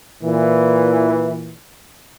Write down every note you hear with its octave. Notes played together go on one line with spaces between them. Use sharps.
A#2 E3